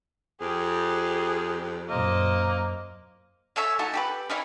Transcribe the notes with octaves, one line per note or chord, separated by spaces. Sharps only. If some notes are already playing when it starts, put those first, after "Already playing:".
F2 G4 G#4
F#2 A#2 A#3 C5 D#5
C#4 A4 C#5 E5
A3 D#4 F#4 A5
G4 A4 B4
C#4 D#4 E4 C#5